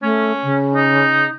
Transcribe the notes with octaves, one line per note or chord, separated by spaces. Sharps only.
A3 C#4
C#3
D#4